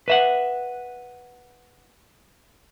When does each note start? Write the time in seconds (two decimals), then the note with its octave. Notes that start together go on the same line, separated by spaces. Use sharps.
0.08 B4 E5 F#5